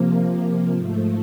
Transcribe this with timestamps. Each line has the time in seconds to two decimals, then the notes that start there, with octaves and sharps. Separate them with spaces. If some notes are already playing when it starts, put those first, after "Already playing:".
Already playing: C3 F3 A#3
0.72 G#2 F3 A3